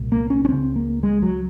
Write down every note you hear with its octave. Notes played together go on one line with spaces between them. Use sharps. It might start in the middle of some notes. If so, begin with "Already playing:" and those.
Already playing: C2 A#2
A#3
C#4
C#4
C#2 C#3 C4
A#3
G#3
F#3